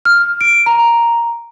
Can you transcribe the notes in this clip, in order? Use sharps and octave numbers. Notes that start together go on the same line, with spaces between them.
F6
D7
A#5